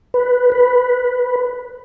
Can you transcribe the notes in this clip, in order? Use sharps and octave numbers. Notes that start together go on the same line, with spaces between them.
B4
B4